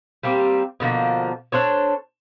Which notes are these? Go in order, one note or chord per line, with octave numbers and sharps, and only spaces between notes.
G3 A#3 C4 G4
B2 D3 F3 A#3
D4 A4 C5 C#5